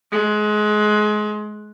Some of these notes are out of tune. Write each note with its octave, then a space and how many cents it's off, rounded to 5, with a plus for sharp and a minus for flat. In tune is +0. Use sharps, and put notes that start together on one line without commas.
G#3 +25